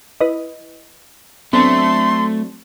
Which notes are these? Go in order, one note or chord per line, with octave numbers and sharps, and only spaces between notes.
E4 B4 D#5
F#3 A3 B3 C4 D4 C6